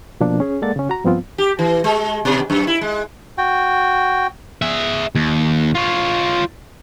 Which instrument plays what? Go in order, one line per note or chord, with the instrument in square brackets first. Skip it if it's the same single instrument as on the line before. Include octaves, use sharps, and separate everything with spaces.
[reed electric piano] B2 F3 A#3 D4
C#4 G#4
G#3 A#3 A4 D5 F#5 A6
C#3 C#4
F#4 A#5
G2 F3 B3 C4 F4
[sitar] G4
E3
G#3
B2
F#2
E4
G#3
[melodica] F#4 G5
[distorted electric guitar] G#4 E5
D#2
F4 C#5